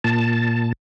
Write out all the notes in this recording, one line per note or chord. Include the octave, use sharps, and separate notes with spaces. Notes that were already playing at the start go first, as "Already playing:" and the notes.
A#2 A5